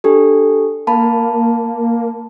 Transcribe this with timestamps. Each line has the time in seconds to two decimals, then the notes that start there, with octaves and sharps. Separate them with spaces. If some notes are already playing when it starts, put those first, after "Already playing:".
0.04 D4 G4 A4
0.87 A#3 A5 B5